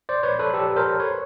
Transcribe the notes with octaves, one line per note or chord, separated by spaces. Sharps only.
C5 D5
B4 C#5
A4 B4
G4 A4
A#4 C5
B4 C#5